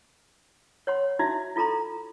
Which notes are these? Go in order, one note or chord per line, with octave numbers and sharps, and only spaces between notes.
C#5 F#5 C6
D#4 E4 F#4 E5
E4 F4 A4 A#5 C6